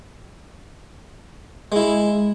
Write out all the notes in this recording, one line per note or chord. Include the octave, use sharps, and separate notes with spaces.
G#3 E4